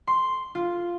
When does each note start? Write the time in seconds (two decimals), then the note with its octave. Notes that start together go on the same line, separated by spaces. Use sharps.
0.07 C6
0.55 F4